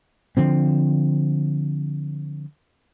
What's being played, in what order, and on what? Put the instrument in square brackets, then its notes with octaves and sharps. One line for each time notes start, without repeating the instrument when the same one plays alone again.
[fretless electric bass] D3 F3 C4